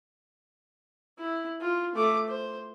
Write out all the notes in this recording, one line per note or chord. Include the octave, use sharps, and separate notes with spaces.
E4
F4
A3 D6
C5